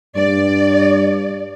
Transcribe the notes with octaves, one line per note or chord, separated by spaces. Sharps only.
G2 D5